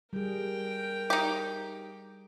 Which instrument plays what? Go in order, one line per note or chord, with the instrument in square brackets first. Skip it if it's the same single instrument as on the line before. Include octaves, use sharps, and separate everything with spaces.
[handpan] G3 G#4 [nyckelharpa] A#4 G5
[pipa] D#4 G4